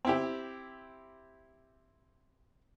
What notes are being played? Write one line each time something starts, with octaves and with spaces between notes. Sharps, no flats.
C4 E4 G4